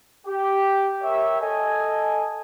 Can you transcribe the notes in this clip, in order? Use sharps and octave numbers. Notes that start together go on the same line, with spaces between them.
G4
G4 A#4 C#5 E5
A4 D#5 G#5